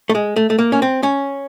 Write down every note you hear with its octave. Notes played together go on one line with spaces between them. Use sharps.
A3
G#3
A3
A3
A#3
C#4
C4
C#4